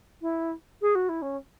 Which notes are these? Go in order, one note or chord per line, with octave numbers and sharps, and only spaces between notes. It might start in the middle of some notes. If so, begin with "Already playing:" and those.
E4
G#4
F#4
E4
C#4